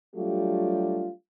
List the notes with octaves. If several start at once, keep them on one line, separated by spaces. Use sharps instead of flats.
F#3 G3 A3 D4 F4 G4